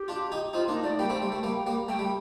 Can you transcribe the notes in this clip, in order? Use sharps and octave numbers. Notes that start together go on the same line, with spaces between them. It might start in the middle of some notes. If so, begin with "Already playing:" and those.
Already playing: G4
D4 F4
D#4 G4
C4 D#4 F4
A#3 D4 D#4
A3 D5
G3 A#3 G5
A3 C4
G3
A3
G3 A#3
G3 A#3
A3 G5
G3